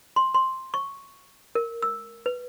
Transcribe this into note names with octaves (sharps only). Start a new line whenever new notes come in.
C6
C6
C#6
A#4
E6
B4